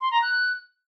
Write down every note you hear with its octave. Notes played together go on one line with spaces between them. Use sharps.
C6
A#5
F#6